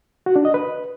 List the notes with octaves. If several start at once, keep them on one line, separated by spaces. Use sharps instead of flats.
F#4
D4
D#5
B4